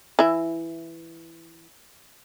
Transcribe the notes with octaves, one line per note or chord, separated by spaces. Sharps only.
E3 E4